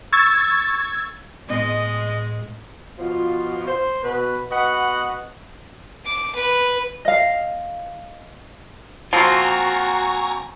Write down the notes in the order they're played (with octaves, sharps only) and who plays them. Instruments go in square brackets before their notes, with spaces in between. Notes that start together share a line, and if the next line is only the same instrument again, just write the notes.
[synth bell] C#6 E6 G#6 A6
[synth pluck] A2 B3 C6 [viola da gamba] G#3 [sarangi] D#5
[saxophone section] B2 F3 F4
C5
B2 B4
B3 F#4 B4 D#5 F#5
[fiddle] D6
B4
[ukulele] D#5 F5
[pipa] F3 [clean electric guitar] A#3 C4 F4 [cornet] F#4 [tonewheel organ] G#5 A#5 C#6